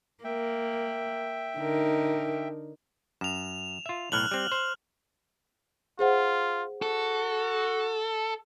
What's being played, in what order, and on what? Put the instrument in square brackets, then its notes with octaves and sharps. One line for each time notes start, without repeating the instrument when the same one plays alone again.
[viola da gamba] A#3 [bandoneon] E5 G5
[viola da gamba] D3 D#4 A#4
[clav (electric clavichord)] F#2 [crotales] E7 F7
[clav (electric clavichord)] F4 E5
[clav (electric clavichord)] B1 A2 [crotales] F6 F#6 F#7
[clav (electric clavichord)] G3 C4
C5
[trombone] F4 [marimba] G#4 C5 F#5
[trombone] F#4 [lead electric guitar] A4